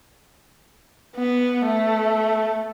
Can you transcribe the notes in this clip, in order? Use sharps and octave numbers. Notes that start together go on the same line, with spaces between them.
B3
A3